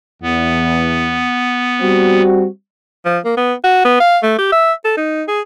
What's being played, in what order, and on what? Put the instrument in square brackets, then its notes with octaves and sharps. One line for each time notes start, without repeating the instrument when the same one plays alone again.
[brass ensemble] E2 [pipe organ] B3
[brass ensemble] G3 C4 F#4
[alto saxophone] F3
A#3
B3
F#4
B3
F5
A3
G4
E5
A4
D#4
G#4